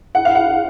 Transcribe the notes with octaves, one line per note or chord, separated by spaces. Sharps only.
F#5
F5
F#5